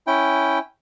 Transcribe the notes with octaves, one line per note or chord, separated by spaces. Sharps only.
C#4 E4 G5